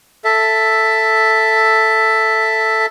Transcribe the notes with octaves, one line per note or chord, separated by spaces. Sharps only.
A4 E5